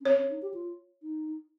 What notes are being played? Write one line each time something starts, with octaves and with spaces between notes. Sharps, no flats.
C#4
C4 C#5
C#4
D#4
G4
F4
D#4